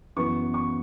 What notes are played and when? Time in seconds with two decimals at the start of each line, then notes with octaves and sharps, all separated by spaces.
0.16 F#2 E3 B3 C#6
0.54 C#6